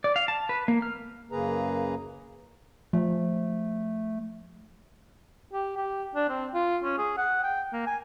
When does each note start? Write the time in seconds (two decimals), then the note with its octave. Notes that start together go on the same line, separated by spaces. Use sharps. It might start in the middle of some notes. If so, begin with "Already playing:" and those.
0.04 D5
0.16 F5
0.28 A5
0.49 B4
0.68 A#3
0.82 F6
1.32 F#2 C#3 A#3 G#4 B4 A#5
2.93 F3 A3
5.53 G4
5.77 G4
6.15 D4
6.29 C4
6.54 F4
6.83 C#4
6.98 G#4
7.18 F#5
7.43 G5
7.73 A#3
7.87 G#5